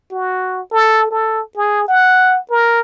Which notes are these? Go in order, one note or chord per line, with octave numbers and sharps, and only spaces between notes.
F#4
A4
A4
G#4
F#5
A#4